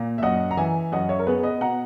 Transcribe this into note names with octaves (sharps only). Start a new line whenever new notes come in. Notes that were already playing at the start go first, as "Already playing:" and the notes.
Already playing: A#2 A#5
E5
F#2 D#5 F#5
A#5
E3 E5 G#5
F#2 D#5 F#5
C#5 E5
A#4
B3 G#4 B4
B4 D#5
B2 F#5 A#5